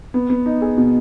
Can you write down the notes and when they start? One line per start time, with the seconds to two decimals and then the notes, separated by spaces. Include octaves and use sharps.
0.14 B3
0.30 B3
0.46 D#4
0.62 G#4
0.78 B2